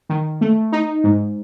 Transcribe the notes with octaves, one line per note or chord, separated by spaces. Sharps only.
D#3
A3
D#4
G#2